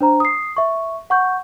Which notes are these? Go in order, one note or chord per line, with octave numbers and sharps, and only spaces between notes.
D4 C5 A#5
D#6 C7
E5 C#6
F#5 C#6 G6